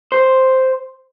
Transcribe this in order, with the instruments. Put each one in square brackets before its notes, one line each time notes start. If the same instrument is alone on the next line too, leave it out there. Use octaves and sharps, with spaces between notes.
[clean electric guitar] C5